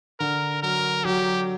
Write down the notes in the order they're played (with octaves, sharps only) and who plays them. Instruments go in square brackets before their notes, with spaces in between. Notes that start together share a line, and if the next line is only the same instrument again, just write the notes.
[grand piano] D3 [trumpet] A#4
[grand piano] F#3 [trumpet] A#4
[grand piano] F#3 [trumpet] G4